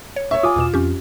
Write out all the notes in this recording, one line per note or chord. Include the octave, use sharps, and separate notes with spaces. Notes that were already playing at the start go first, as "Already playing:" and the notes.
C#5
C#5 E5 C#6
F4 G#5 D6 D#6
E2 B2 E7
F2 C#4 G4